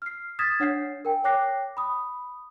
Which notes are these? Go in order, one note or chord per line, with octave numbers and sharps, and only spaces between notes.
F6 C7
D#6 F6 G#6 A6 B6 E7
D4 C#5 F#5 G6 C7
A#4 G5 G#5
C#5 G5 D6 F#6 A#6 C7
B5 D#6